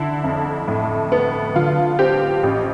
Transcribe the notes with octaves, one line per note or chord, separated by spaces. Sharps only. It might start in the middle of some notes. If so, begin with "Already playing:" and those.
Already playing: D3 E4
F2
A2
B3
D3 F4
C4 G4
A1 G4